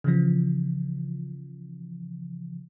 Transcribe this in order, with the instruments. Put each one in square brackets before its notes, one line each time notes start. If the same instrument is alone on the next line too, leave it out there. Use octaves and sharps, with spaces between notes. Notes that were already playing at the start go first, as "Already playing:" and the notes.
[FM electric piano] C#3 E3 F3